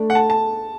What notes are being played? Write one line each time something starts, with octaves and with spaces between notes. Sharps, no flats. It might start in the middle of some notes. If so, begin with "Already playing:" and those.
Already playing: A3 D4
F#5
A5
A5